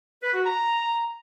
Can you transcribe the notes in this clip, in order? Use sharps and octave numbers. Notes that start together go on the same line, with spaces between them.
B4
F#4
A#5